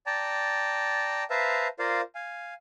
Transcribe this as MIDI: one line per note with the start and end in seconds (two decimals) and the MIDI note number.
0.06 1.24 74
0.06 1.24 79
0.06 1.24 81
0.06 1.24 82
1.30 1.68 71
1.30 1.68 72
1.30 1.68 76
1.30 1.68 77
1.30 1.68 81
1.30 1.68 82
1.79 2.01 65
1.79 2.01 70
1.79 2.01 72
1.79 2.01 74
1.79 2.01 77
2.15 2.54 77
2.15 2.54 80